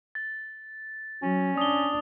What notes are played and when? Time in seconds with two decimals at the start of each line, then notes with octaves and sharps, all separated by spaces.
0.15 A6
1.23 F#3 C#4
1.58 D4 D#6 G7